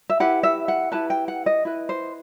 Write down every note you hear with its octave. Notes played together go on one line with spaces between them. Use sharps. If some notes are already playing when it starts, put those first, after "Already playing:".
E5
E4 G4 B4 F#5
E5
F#5
E4 G4 B4 A5
G5
F#5
D#5
E4 B4
C5